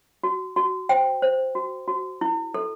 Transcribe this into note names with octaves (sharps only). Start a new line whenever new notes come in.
F#4
F#4
C5 G5
C5
F#4
F#4
E4
A4